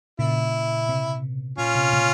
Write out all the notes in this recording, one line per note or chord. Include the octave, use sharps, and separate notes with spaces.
A#2 C#3 E4
C3
A#2 C#4 F4
C3
A#2 C#3